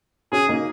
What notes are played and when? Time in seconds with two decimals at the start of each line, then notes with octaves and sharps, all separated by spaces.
0.32 C#4 F#4 G#4
0.49 A#3 D#4